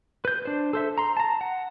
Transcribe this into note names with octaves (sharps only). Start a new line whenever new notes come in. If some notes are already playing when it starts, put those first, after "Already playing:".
B4 G6
D4 C5
A4 C5 E5
A#5 C6
A5 A#5
F#5